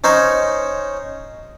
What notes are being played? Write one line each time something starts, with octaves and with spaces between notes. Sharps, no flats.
C#4 D#4 C5 C#5